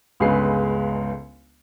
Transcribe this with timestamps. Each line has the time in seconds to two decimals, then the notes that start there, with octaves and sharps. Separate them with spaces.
0.20 G1 C#2 C#3 G#3 B4 C7